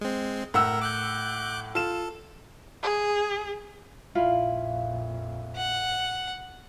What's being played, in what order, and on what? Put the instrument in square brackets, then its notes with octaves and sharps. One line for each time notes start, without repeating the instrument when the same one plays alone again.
[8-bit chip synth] G#3 C4
[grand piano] A2 F#5 E6 [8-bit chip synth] A#4
[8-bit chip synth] D6 F#6 G6
[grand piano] F4 E7 [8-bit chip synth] A4
[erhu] G#4
[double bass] A#1 F2 [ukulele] E4 F4 F5
[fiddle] F#5